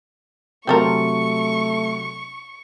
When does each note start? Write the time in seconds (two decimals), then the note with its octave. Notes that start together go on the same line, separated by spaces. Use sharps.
0.67 C3 F#3 A3 C4 A4 A#4 C6 C#6